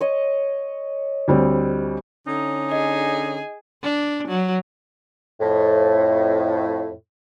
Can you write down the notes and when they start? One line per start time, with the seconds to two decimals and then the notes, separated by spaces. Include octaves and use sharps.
0.01 C#5 D#5
1.28 D2 G3 C4
2.27 D3 C#4 D#4
2.71 G#4 D#5
3.83 D4
4.28 F#3
5.40 F2 A2